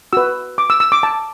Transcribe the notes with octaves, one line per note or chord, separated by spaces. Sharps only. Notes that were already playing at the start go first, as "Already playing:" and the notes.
F#4 B4 E6
D6
E6
E6
D6
A5